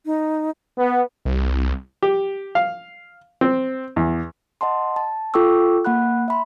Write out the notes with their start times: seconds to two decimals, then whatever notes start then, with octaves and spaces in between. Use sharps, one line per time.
0.06 D#4
0.78 B3
1.25 C2
2.03 G4
2.55 F5
3.41 C4
3.96 E2
4.61 D#5 F#5 A5 C6
4.96 A5
5.34 F4 A4 G5 C#6 D6 E6
5.85 A#3 F#5 B5 F#6
6.28 E5 B5 C6